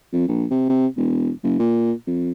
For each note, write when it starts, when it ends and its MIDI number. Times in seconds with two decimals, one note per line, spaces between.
0.13 0.28 41
0.28 0.45 34
0.51 0.66 48
0.69 0.87 48
0.97 1.30 28
1.43 1.59 30
1.59 1.92 46
2.07 2.32 41